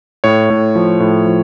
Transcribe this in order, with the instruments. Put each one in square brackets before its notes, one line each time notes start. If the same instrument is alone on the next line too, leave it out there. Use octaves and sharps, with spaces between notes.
[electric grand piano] A2 C#5
A2
F3
A2
F3